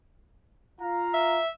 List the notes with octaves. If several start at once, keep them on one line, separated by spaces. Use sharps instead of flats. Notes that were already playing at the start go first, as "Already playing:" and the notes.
F4 F5 A#5
E5